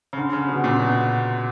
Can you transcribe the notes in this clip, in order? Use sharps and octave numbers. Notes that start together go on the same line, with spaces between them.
C#3
D3
C#3
B2
A#2
B2